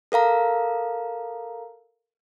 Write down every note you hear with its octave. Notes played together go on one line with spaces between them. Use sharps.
A4 A#4 F5 A#5